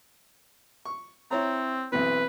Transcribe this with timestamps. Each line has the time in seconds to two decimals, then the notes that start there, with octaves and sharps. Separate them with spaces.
0.85 C#6
1.31 C4 E4 C#5 A#5
1.92 B1 E3 C4 B4